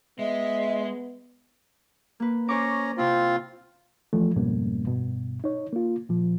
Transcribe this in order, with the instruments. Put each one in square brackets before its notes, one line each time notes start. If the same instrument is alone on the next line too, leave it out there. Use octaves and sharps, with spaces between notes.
[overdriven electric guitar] G#3 [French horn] B3 [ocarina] D#5 [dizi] E5
[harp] A#3 B4
[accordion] C#4 A#5 [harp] C5 C#6 D6
[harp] C3 E4 C6 [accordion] C4 F4
[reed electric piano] E3 F3 A3
F2 G#2 B2 G3 A#3 C#4
G2 B2
D#4 C#5
A#3 F4
A#2 F3